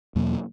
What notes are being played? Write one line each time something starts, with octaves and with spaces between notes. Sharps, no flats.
E2 B2 F#3 A#3